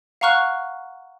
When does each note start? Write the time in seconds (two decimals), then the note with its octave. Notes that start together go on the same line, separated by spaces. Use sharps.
0.21 F5 F#5 A#5 C#6 F6 F#6